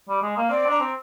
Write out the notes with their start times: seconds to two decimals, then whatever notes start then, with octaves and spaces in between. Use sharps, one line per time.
0.09 G3
0.22 G#3
0.37 A#3
0.50 C4 D5
0.66 D4 A#5
0.80 C4